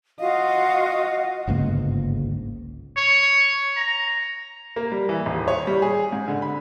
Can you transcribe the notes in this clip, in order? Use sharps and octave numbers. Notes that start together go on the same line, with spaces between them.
F4 F#4 D#5 F5
G1 C#2 G#2 A#3
C#5
A#5
A#3
G3
E3
D#1
C#5
G3
G#4
G#2
D3
B5